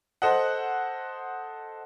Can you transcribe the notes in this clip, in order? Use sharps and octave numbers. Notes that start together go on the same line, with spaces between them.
A4 C5 D#5 F#5